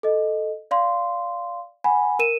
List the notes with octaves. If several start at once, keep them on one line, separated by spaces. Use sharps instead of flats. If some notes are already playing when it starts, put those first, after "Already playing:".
A4 D#5
D5 F5 C6
F#5 G#5 B5
A#4 D#7 E7